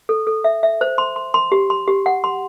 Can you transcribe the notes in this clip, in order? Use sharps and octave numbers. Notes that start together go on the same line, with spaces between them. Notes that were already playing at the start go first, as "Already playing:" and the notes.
A4
A4
E5
E5
C5
C6
C6
C6
G4
C6
G4
F#5
C6